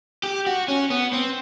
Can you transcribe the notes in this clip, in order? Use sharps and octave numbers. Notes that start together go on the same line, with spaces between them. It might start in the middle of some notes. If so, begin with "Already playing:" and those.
G4
F#4
C#4
B3
C4